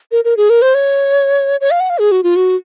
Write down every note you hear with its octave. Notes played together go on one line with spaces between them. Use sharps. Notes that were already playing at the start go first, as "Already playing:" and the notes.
A#4
A#4
G#4
A#4
C5
C#5
C#5
F5
F#5
F5
G#4
F#4
F4
F#4